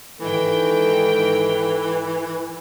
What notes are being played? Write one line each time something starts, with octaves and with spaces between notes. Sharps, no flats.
G#2 D#3 E3 A4 G5